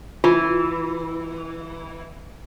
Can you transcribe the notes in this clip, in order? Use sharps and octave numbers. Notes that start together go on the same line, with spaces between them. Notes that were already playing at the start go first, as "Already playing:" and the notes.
E3 F4